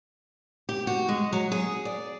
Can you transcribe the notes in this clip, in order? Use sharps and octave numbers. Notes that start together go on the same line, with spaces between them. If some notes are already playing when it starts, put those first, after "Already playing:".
G4
F#4
G#3
F#3
G#4
D5